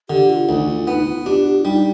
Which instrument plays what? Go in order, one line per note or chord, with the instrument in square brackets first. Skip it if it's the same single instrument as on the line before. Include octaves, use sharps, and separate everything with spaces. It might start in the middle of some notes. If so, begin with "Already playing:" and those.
[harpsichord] D3 [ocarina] G4
[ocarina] F4
[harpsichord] D2 [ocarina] D#4
[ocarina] F4
[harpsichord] B3 [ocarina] D#4
[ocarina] F4
[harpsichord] D4 [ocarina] G4
[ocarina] G4
F4
[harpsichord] G3 [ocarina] D#4